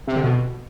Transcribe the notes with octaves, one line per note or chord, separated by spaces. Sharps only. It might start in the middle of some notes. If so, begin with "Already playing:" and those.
C3
D3
B2